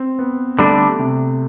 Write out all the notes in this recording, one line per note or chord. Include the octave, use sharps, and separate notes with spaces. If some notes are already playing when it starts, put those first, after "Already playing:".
Already playing: C4
B3
D3 G3 A3 D4
C3